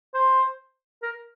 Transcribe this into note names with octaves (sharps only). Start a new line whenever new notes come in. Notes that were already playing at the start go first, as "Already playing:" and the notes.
C5
A#4